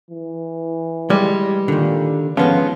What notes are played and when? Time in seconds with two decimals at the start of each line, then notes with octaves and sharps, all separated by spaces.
0.11 E3
1.10 G3 G#3
1.68 A#2 D3 D#3
2.37 G#2 F3 G#3 B3 C#4